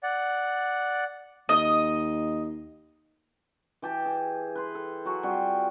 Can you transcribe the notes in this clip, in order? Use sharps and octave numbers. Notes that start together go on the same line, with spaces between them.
D5 F#5
D#2 D#5
E3 G4 A5
G#4
B4 C6
A4
F#3 F#4 G#4
G3 C4 F4 F#4